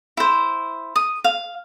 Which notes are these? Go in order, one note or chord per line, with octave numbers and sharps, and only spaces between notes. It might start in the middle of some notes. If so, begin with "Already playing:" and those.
E4 C5
D#6
F5